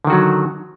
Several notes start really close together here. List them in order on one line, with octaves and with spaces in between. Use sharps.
D3 D#3 F#4 F#3